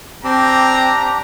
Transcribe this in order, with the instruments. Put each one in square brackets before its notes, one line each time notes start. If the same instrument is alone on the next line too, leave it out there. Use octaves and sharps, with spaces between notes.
[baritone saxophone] C4 [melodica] D4 G4 [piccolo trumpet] A#5